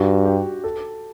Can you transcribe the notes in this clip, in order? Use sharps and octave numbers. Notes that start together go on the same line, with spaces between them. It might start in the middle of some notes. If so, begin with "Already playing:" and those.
Already playing: G2 F#4
G4
A4